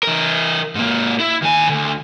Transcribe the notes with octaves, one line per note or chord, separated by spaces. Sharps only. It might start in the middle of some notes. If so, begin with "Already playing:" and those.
E3 A#4
G#2 A#3
E4
D#3 G#5
D2